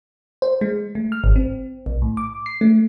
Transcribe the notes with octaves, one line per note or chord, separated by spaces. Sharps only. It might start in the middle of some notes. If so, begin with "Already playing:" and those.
C5
G#3
A3
F6
G#1
C4
B1
A2
D6
C7
A3